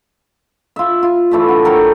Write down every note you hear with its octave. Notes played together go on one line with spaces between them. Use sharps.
F4 E5
F4
E3 A3 D5 E5
D4 F#5
A4 A#4 C#5 G5